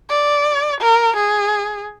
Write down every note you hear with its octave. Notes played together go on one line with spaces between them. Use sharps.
D5
A#4
G#4